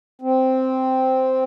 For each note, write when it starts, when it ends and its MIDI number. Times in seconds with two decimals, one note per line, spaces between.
0.21 1.44 60